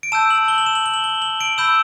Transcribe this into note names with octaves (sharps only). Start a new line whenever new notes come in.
D7
A5 E6 G6 E7
F#7
G7
F#7
E7
F#7
G7
F#7
G7
F#7
D7
B5 E6 G6 E7